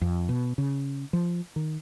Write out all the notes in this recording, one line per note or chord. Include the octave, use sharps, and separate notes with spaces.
F2
B2
C#3
F3
D#3